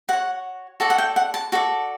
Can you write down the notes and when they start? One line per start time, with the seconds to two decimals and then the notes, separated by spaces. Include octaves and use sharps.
0.09 F#4 C#5 F#5
0.80 F#4 A4 D5 A5
0.90 F#5
0.98 G5
1.16 F#5
1.34 A5
1.52 F#4 A4 D5